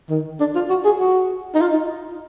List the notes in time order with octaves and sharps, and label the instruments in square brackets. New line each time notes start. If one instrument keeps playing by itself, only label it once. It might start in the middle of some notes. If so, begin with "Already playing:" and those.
[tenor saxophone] D#3
D4
F4
F#4
G#4
F#4
D#4
F4
D#4